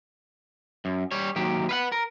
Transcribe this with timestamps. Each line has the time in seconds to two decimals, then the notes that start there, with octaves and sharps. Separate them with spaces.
0.85 F#2
1.11 G3 C#5
1.36 D#2 F#3 G4
1.69 B4 F5 F#5
1.92 A#4